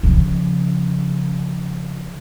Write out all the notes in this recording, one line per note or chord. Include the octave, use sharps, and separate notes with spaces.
C#3 F3